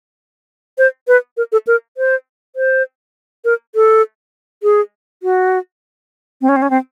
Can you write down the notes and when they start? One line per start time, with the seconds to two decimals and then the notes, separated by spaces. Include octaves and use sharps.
0.78 C5
1.08 B4
1.37 A#4
1.52 A4
1.67 A#4
1.97 C5
2.56 C5
3.45 A#4
3.75 A4
4.63 G#4
5.23 F#4
6.41 C4
6.49 C#4
6.56 C4
6.62 C#4
6.70 C4